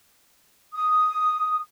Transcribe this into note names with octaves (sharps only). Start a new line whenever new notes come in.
D#6